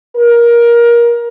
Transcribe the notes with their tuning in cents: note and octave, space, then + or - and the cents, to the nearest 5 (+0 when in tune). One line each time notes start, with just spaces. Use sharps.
A#4 +20